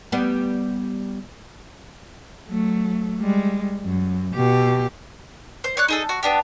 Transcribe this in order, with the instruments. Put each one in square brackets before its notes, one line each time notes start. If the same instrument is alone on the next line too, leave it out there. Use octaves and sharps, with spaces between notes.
[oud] G3 B3
[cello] F#3 A3
G3 G#3
F#2
B2 G4
[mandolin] C5
C#5 D5 F#6
D#4 G#4 A4
F#4
B3 D4 G4